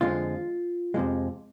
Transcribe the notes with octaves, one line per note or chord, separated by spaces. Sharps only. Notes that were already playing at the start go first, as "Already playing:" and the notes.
F2 D3 F3 G#3 F4
F2 C3 F3 G#3